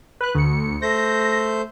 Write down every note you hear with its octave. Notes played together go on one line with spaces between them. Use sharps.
B4 F#6
D2 C#7
A3 C5 G6 A#6